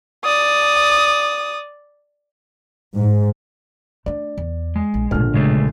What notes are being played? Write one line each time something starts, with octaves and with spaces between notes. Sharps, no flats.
D5 D#6
G#2
A3 D4 D5
E2
G#3
A#1
A#1 G#2 B2 D3 F6
C#3 G#3 A3